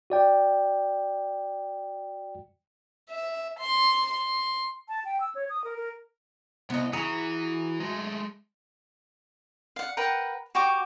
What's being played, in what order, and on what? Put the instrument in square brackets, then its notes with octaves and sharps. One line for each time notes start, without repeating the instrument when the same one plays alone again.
[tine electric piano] F#4 D5 G5
[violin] E5
C6
C6
[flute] A5
G5
E6
C#5
D#6
A#4
A#4
[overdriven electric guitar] C2 [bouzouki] B3 D#5
[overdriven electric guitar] E3 [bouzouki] F#4 [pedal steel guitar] G#4 A#5
[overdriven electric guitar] G#3 A3
[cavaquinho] F5 F#5
A#4 B4 F#5 G5
F#4 G4 C#6 D6